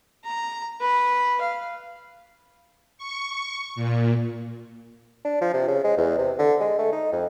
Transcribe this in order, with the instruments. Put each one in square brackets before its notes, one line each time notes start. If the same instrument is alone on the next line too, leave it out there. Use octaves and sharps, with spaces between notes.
[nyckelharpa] A#5
B4
F5
[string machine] C#6
A#2
[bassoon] D4
F3
C3
C#3
G#3
E2
C3
D3
G#3
A3
D#4
F2